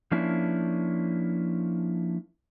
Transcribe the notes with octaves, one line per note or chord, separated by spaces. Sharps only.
F3 A#3 C#4 D4 E4